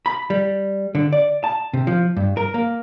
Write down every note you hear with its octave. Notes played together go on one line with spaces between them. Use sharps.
B5
G3
D3
D5
A5
C3
F3
G2
A#4
A#3